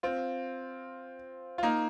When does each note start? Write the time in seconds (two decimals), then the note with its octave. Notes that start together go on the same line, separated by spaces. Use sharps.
0.03 C4 F4
1.58 F4
1.63 A#3 D#4